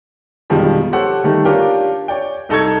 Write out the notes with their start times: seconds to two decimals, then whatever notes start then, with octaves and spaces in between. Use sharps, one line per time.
0.50 F2 B2 D#3 F3 G3 G#3
0.93 G4 A4 C5 C#5 F#5
1.24 D#3 G3 A3 B3 D#4
1.45 D4 F4 G4 A#4 C#5 G5
2.08 C#5 D5 G5
2.49 C2 D#4 A4 A5 C#6 G#6